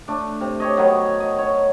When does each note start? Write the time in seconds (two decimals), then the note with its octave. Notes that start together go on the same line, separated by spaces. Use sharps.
0.08 A3 D4
0.41 C3
0.60 G4 C#5 D#5
0.77 D#3 F#3 B3 C#5
1.20 D#5
1.38 C#5